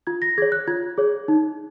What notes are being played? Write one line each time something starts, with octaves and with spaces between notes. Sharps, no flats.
F4 G#6
A#6
G#4 C#5 G#6
F#6
F4 G#6
G#4 C#5
D#4